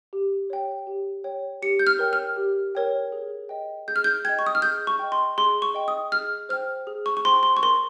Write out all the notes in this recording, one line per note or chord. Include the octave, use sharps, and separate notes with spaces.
G4
C#5 G5
G4
C#5 G5
G4 C#7
G6
F6
A#4 C#5 G5
F6
G4
A#4 C#5 G5
G#4
D#5 G5
G#4 G6
F6
G6
D#5 G5 G#6
C#6
D#6
F6
G#4 G6
C#6
D#5 G5
C6
G#4 C6
C#6
D#5 G5
D#6
G#4 F6
C5 G5 F6
G#4
C#6
C#6
C5 G5 C6
C6
C#6
A#4 C6